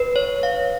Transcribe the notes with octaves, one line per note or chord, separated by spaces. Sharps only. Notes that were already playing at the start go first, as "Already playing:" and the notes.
Already playing: B4
C#5
F5